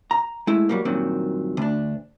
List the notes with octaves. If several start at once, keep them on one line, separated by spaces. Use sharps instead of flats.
A#5
G#3 A3 E4
F#3 G3 A#3
G2 A#2 D#3 F#3 C4
D2 D4